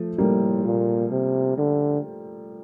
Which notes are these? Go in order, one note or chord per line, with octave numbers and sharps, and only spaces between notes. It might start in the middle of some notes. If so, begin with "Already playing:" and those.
Already playing: F3 A3
A2 G3 A#3
A#2
C3
D3